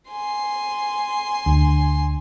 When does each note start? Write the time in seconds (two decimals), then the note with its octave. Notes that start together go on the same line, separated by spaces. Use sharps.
0.11 G#5 C6
1.46 D2